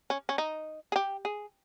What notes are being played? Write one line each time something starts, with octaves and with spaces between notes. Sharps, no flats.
C#4
C#4
D#4
G#4
G4
G#4